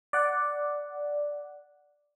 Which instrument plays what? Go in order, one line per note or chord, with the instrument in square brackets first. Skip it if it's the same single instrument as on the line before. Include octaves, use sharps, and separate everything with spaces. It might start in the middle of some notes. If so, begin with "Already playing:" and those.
[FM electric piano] D5 F#5